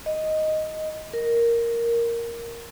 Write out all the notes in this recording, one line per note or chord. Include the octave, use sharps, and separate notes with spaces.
D#5
A#4